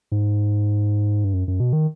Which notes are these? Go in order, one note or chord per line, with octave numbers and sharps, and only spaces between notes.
G#2
G2
F#2
F#2
B2
D#3